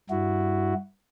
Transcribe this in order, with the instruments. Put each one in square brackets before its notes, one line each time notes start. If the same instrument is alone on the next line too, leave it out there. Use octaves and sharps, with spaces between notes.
[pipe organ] G2 E4 F#4